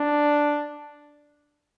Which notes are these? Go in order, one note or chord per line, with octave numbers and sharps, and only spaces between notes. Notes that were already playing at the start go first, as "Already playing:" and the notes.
Already playing: D4